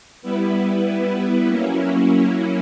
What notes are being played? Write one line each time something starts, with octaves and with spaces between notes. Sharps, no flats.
G3 B3 E4 B4
F#3 A#3 C#4 E4